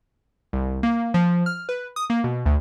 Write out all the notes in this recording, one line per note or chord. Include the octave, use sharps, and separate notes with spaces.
C2
A#3
F3
F6
B4
D#6
A#3
B2
D2